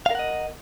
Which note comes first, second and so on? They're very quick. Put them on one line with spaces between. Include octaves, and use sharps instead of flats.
F5 A#4 F#5 D#5